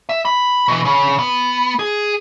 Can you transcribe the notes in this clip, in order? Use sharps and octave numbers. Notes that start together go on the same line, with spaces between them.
E5
B5
B2 E3
C#3
B3
G#4